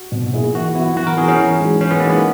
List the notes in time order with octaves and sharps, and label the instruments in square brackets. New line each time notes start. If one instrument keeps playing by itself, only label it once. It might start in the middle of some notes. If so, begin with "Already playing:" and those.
Already playing: [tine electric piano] F#4
[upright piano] B2
A#3 E4 G#4
[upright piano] E3 [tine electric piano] F#4
[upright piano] B3 F#4 [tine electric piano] E4
[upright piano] E3 [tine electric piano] F#4
[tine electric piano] A#4
[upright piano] B3 F#4 [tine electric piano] G#4
[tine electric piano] C#4
[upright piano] E3
G#3 D#4 F#4
[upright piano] E3 [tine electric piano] C#4
[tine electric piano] B3
[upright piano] G#3 D#4 F#4 [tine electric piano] A#3
[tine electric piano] B3